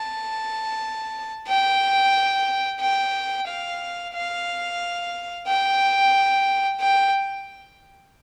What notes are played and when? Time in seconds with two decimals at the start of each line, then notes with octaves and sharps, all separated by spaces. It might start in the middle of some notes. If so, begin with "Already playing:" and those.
Already playing: A5
1.48 G5
2.81 G5
3.47 F5
4.14 F5
5.47 G5
6.80 G5